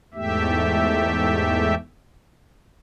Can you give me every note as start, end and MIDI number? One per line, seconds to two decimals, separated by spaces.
0.14 1.75 40
0.14 1.75 44
0.14 1.75 57
0.14 1.75 67
0.14 1.75 76